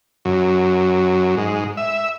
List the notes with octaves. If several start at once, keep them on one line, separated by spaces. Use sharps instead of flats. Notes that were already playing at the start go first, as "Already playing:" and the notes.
F#2
G#2
E5